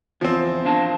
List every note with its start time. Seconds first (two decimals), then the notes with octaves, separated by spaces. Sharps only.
0.21 E2 F3 C4
0.65 D4 F5 A5